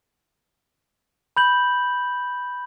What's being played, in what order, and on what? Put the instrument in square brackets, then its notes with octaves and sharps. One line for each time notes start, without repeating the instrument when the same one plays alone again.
[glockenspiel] B5 G6 F#7